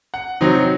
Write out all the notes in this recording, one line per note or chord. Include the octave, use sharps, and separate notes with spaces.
F#5
C3 F#3 C4 D#4